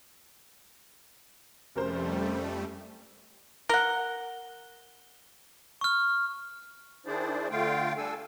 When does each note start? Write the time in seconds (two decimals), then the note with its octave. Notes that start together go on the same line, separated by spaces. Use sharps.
1.75 F1 F2 G3 A3 C#4 A#4 C5
3.69 A#4 F#5 G7
5.81 C#6 F6
7.06 D#3 D4 E4 G#4 C5 D5
7.51 D3 A3 F4 F5 G5
7.97 G3 D4 A4 G#5 E6